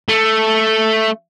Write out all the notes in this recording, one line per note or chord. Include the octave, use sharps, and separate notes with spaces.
A3